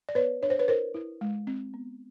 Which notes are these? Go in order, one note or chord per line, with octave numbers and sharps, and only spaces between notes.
D5
B3 B4 C#5
D4 C#5
C5
B4 C#5
E4 A#4 C5
E4
G#3
C4
B3